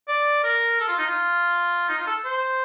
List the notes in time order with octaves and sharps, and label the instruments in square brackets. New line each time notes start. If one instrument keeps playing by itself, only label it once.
[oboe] D5
A#4
A4
F4
D#4
F4
D#4
F4
A4
C5